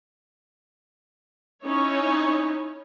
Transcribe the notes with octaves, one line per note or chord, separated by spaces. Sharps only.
C#4 D#4 E4 C#5